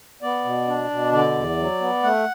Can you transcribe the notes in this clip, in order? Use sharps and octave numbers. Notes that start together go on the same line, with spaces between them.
B3 D5
B2
D4
B2
D3 D5
E2
F#3
B3
A3 F#5